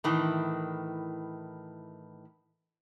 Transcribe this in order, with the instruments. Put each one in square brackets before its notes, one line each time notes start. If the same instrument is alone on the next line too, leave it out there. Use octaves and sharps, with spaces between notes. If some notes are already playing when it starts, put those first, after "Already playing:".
[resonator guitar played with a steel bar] A2 D#3 E3